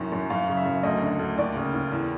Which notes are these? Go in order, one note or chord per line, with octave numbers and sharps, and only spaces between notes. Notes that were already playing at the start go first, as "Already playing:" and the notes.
Already playing: C2 F#2 D#3
F#2
F#2 F5
C#3
E5
F#2
D2 D#5
D3
D2
D#2 D5
C#3
D#2
E2